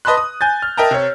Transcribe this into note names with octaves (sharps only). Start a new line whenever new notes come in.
B4 D#5 A5 B5 C6 F#6
D#6
G#5 G6 A6
F6
A#4 D#5 E5 G5 A5 A#5
C3 C#5